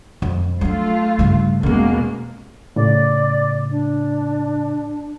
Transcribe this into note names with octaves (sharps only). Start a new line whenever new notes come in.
F2 F#3
F#3 A3 D4 F4
G2 C#3
E2 B2 G#3 A#3 C#4
A2 C#3 D5
D4